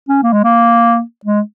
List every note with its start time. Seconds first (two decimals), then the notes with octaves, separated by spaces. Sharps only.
0.09 C#4
0.23 A#3
0.33 G#3
0.44 A#3
1.25 G#3